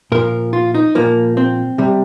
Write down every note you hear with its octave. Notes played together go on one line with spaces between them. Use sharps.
A#2 F3 A#4
F4
D#4
A#2 F3 A#3
C4
C3 G3